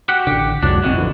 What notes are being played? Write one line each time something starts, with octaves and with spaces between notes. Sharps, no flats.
F#4 G4 F#5
A1 D3 G4
C2 F2 G#2 F#3 D4
F1 A#1 B2 E3 C4
A1 D3 F3